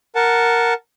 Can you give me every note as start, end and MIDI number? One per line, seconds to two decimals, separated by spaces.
0.15 0.74 70
0.15 0.74 78
0.15 0.74 81